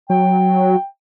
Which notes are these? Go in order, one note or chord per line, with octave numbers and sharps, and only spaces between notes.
F#3 G5